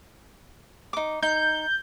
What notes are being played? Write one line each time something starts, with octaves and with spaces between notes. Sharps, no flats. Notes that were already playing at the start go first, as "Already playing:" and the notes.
D#4 D6
D#4 G6